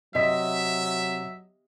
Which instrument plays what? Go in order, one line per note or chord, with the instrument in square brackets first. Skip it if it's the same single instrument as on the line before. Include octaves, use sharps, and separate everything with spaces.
[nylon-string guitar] C3 [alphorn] F#3 [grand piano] D#5 B6 [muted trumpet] E5